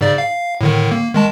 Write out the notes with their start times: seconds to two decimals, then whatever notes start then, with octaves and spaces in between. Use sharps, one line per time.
0.01 G#2 C#3 D5
0.18 F5
0.61 A2 D3 D#3
0.91 A#3
1.14 D#3 G#3 A5